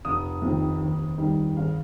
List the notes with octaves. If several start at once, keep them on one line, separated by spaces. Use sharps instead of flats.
F1 D#6
F2 C3 D#3
D#2
D#3 G3
G#1 F5